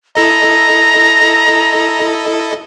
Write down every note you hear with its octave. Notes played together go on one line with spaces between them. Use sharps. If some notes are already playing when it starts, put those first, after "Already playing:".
E4 A4 D#5 A#5